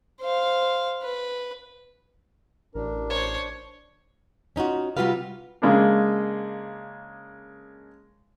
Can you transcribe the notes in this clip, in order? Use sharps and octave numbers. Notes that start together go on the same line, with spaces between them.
C5 F5
B4
A1 D4 A#4
C5 C#5
C#4 D#4 F4 F#4
C3 G3 F4 F#4 B4 F5
C#3 G#3 A#3 D4